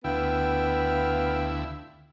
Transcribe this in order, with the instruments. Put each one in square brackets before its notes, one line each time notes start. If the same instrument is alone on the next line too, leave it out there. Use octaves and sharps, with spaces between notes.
[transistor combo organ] D2 E4 [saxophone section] B3 F5 [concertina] G5